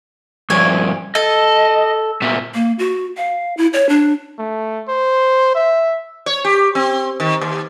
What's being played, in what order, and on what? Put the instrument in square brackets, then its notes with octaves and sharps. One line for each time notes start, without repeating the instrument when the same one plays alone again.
[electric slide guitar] G2 F3 D5 [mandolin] C#5 G#5
[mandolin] A4 [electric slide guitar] D#5
[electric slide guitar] A#2 B3 E5
[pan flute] A#3
F#4
F5
E4
C#5
D4
[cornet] A3
C5
E5
[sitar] C#5
G4
C4
D#3
D#2